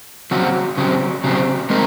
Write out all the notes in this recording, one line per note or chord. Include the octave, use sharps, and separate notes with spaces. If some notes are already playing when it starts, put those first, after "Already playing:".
C#3 F#3 C4 F#4
C#3 F#3 C4
C#3 F#3 C4
G#3 C4 D#4 A#4